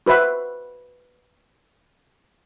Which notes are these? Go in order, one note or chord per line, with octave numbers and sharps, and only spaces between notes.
F#4 B4 C5 E5 F#5